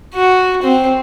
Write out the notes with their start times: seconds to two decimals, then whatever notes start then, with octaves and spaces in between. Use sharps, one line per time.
0.14 F#4
0.62 C4